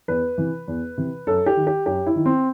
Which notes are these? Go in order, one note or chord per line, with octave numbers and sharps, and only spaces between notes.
E2 B4
C3 E3
E2
C3 E3
F#2 A4
G4
D#3
G4
F#2 G4
E4
D#3
C4